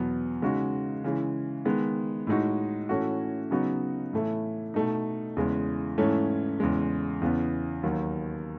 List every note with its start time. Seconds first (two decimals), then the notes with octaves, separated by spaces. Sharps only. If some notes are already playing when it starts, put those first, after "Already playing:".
Already playing: E2 B2 F#3 B3
0.42 C#3 G#3 D#4 F#4
1.04 C#3 E3 G#3
1.65 D#3 G#3 B3
2.27 A2 G#3 D#4 F#4
2.89 A2 E3 A3 C#4 F#4
3.51 C#3 F#3 B3 D#4 F#4
4.13 A2 E3 A3 E4
4.74 B2 A3 D#4
5.37 E2 C#3 E3 G#3
5.98 G#2 E3 A3 C#4
6.60 E2 C#3 G#3
7.21 E2 C#3 E3 B3
7.83 D#2 D#3 F#3